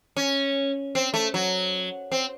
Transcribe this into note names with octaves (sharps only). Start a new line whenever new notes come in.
C#4
C4
A3
F#3
C4